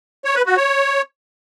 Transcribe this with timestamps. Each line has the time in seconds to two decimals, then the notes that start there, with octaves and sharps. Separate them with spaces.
0.25 C#5
0.35 B4
0.46 F#4
0.57 C#5